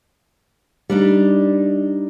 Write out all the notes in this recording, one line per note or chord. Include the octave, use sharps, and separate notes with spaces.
G3 D4 D#4